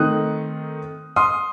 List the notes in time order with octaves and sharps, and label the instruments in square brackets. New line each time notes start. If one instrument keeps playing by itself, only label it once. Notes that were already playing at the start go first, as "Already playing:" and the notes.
Already playing: [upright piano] D#3 A3 C4 D#4 D#6 F#6
C6 D#6